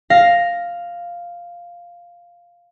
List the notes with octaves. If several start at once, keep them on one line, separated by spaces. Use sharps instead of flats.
F5 A#6